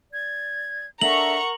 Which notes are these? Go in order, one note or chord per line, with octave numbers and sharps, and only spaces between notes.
D5 G#6
D4 A4 A#4 E5 F#5 A#5 C#6 F#7